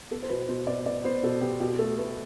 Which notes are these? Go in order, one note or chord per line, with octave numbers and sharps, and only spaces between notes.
B3 A4
C5
B2 B4
B2 C5
B3 D5
B3 D5
B3 C5
B2 A4
B3 G4
B2 G4
A3 A4
A3 B4